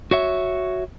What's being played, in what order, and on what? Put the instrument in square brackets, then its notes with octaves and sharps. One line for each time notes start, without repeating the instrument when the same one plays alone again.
[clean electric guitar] F#4 C#5 E5